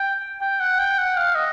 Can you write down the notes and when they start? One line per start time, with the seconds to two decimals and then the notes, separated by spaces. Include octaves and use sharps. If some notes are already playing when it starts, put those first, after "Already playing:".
Already playing: G5
0.41 G5
0.60 F#5
0.79 G5
0.98 F#5
1.17 F5
1.35 D#5